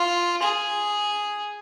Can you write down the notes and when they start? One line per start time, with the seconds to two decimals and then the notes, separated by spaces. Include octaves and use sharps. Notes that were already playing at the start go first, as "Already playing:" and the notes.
Already playing: F4
0.42 G#4